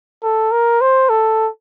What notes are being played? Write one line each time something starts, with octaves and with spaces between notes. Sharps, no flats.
A4
A#4
C5
A4